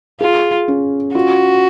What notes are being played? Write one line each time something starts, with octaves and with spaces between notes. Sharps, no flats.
F4 G#4
C#4
F4 F#4